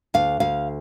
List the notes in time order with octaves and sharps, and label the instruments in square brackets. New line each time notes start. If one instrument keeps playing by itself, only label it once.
[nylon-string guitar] D2 F5
D2 F5